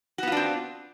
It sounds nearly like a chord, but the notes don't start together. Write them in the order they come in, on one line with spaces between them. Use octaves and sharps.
F#4 B3 F4 D4 C4